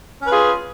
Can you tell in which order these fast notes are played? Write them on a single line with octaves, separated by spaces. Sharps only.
C#4 B4 F4 G#4